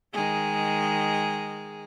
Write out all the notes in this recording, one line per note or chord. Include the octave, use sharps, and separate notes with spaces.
D#3 G#3 G#4